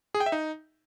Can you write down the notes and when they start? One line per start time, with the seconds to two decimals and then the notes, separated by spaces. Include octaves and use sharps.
0.15 G#4
0.20 G5
0.26 E5
0.32 D#4